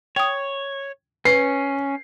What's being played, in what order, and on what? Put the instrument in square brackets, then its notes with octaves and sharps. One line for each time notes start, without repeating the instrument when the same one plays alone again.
[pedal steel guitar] C#5 [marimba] G5 D#6
[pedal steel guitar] C#4 [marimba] B4 [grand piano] C7